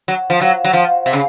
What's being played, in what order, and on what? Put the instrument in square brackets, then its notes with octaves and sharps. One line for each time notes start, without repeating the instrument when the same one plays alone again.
[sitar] F#3
F3
F#3
F#3
F3
C3
C#3